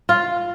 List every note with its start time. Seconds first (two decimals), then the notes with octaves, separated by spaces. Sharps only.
0.09 F4